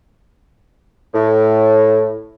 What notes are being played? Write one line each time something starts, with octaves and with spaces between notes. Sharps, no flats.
A2